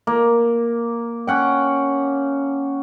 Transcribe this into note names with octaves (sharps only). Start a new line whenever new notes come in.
A#3
C#4 F#5 G5